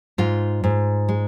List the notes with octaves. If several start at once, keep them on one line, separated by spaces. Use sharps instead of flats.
G#2 F4
G#2
G#3